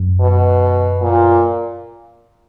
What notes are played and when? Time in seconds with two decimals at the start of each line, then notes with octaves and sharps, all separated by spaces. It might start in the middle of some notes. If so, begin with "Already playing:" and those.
Already playing: F#2
0.21 B2
1.02 A#2